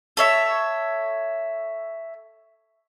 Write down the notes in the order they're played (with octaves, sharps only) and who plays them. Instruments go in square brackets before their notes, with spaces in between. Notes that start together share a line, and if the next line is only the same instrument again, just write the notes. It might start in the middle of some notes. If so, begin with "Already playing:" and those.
[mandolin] A4 C#5 E5